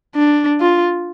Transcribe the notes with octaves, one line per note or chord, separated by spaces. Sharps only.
D4
F4